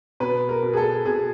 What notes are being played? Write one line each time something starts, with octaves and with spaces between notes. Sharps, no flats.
B2 B4
A#4
B2
G#4
A4
B2 G#4